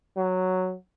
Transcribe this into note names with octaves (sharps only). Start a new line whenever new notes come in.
F#3